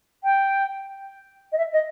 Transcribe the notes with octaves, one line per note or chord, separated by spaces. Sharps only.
G5
D#5
E5
D#5